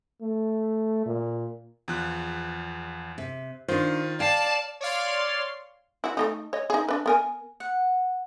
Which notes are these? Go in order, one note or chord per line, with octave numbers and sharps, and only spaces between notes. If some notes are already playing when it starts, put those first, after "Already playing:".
A3
A#2
E2 F3 F#6
C3
D#3 D4 F4 C5
D5 F5 G5 A5 C7
C#5 D5 F5 C6
E4 F#4
A3 A#3 D#4
C#5 D#5
D#4 G#4
D4 B4
B3 A#4 G#5
F#5